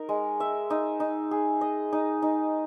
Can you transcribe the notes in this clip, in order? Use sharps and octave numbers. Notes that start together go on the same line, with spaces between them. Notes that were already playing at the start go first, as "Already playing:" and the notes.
Already playing: D#4 A#4
G#3
E5
D#4
D#4
G#4
D#5
D#4
D#4